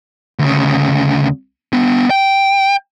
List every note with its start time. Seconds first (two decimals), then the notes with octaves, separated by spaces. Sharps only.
0.39 D2 C#3
1.73 B3 D4
2.10 G5